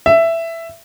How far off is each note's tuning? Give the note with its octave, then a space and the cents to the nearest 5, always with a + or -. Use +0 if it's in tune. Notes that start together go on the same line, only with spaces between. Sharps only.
E5 +10